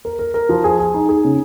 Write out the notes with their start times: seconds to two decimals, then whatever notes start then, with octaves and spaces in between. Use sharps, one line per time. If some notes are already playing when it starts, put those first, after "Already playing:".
0.05 A#4
0.19 A#4
0.34 A#4
0.49 F3
0.64 G#4
0.79 G#4
0.94 D#4
1.09 G#4
1.24 C#3